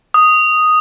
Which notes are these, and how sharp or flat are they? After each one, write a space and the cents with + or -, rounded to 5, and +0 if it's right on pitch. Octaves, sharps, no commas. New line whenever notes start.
D#6 +0